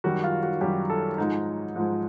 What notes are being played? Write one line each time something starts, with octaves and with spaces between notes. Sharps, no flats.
F#2 D#3 G3 F#4
F4
F#4
F#2 D#3 G3 G4
A4
G#2 F3 G#3 D#4
G#2 F3 G#3